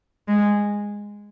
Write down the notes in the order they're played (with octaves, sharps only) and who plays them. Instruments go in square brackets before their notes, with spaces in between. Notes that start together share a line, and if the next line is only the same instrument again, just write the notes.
[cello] G#3